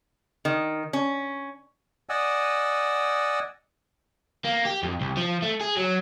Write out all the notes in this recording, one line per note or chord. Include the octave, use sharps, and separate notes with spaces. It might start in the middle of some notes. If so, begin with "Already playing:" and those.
D#3
C#4
D5 D#5 F#5 G#5 E6
A#3
G4
F2
C2
F3
A3
G#4
F#3